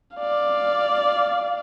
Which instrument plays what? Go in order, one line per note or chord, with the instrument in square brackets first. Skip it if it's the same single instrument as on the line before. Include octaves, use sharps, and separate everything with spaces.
[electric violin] D5 F5